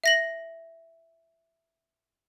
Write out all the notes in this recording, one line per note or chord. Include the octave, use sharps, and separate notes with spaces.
E5 A#6 F#7